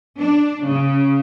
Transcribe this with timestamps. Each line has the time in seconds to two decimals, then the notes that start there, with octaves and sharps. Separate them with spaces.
0.18 D4
0.65 C#3